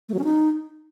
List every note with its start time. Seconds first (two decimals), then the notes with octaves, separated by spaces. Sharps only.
0.09 A3
0.14 F#3
0.19 C#4
0.24 D#4